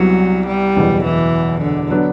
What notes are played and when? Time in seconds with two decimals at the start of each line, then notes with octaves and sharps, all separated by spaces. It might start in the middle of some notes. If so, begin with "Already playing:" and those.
Already playing: C2 C3 F#3 G3 B3 E4
0.47 G3
0.76 F#1 E2 B2
1.04 E3
1.61 D3
1.90 F#3 B3 D4